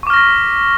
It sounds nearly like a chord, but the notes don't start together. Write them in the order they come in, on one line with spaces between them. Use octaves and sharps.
C#6 D6 F6 A#6 B6